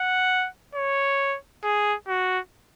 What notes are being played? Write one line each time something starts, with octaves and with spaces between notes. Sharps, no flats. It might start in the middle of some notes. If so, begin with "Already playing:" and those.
Already playing: F#5
C#5
G#4
F#4